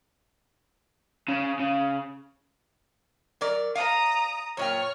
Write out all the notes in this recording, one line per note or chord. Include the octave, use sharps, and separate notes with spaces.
C#3
C#3
F#3 A#4 D5
F5 A#5 D#6
F#2 A#2 C#5 G5 F6